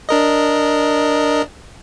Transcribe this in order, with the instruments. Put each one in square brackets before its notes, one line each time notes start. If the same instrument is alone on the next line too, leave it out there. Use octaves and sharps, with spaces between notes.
[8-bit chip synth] D4 A#4 D#5